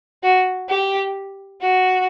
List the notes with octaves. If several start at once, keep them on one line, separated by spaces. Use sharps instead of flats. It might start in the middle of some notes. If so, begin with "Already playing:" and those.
F#4
G4
F#4